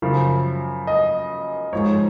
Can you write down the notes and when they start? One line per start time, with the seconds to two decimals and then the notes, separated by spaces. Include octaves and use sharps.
0.02 F#2 C#3 F3
0.87 D#5
1.73 G#2 F3 G#3 C#5